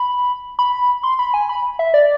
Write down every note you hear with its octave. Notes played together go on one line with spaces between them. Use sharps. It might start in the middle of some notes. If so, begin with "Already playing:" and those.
Already playing: B5
B5
C6
B5
G#5
B5
E5
D5